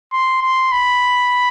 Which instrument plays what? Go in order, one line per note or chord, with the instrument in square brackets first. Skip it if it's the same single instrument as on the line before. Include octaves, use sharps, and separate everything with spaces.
[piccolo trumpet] C6
C6
B5